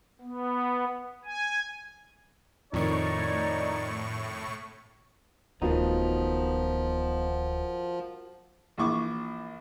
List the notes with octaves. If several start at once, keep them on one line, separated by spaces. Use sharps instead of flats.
B3
G#5
F2 A2 D#3 D#4 C#5 D5 C#6
D1 D#3 F3 B3 D#4 F4 F#4 A#4
A#1 E3 C#6 D6